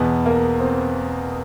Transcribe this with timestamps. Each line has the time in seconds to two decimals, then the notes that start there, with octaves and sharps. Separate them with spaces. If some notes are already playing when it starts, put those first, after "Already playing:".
Already playing: E2 B2 B3
0.26 A#3
0.60 C4